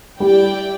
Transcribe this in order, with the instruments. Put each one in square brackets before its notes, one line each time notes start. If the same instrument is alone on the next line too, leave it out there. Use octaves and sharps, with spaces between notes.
[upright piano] G3 [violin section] E4 G4 D5 G5